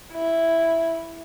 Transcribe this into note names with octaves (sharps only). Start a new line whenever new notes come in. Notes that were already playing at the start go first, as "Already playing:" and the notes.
E4